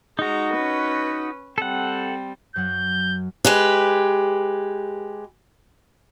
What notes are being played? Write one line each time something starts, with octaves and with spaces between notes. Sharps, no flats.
G#3 D#4 F#4 A#5
C#4 B4
G3 C4 A4 F#5
F#2 F#3 F#5 G6
G#3 G4 B4